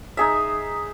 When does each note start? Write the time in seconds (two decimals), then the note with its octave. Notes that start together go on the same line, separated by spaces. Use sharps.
0.17 D#4 G#4 E5